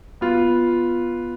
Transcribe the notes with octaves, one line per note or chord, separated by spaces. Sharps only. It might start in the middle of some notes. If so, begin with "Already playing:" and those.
B3 F4